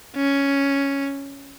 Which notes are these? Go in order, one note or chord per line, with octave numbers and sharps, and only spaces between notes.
C#4